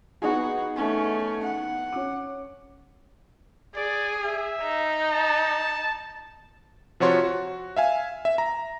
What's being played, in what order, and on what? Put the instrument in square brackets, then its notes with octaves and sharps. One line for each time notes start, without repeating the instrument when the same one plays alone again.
[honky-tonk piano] B3 D#4 G#4 [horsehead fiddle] F#4
[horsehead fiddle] A3 C#4
F#5
[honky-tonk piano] C#4 D6
[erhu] G#4 [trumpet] D5
[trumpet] E5
[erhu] D#4
[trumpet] A5
[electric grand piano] C3 F3 F#4 C#5 C6 C#6
F#4
E5 F5 G#5
E5
A#5